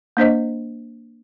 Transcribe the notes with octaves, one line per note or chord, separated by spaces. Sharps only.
A#3 D4 C5 D#5